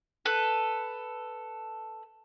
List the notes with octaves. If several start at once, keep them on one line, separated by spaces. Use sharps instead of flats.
A4 B4